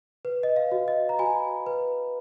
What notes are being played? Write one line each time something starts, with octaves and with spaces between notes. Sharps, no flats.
B4
D#5
F5
F#4
D#5
A#5
F#4 G#5 B5
B4